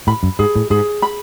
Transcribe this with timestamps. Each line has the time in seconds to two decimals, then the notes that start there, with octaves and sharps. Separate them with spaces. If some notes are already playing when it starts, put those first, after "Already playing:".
0.07 A2 B5
0.23 F#2
0.39 G#2 G#4
0.56 A2
0.70 G#2 G#4
1.02 B5